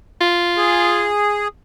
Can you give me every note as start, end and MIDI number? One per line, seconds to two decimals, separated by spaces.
0.21 1.11 65
0.57 1.48 68